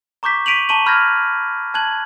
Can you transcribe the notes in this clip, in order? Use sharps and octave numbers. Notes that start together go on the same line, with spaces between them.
A#5 C#6 D6 G6 B6
C#6 B6 D7 D#7 F7 F#7
A5 A#5 C#6 D#7 F#7
B5 F6 G6 G#6 A#6
A5 F#6 G#6 F#7